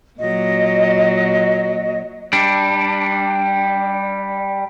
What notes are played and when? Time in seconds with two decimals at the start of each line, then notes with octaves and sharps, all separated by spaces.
0.20 A#2 F#3 D#5
2.33 G3 D4